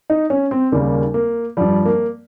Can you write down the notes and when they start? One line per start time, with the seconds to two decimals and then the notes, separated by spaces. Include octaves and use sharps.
0.10 D#4
0.30 C#4
0.51 C4
0.72 D#2 C#3 G3 A#3
1.14 A#3
1.57 G2 F3 G3
1.85 A#3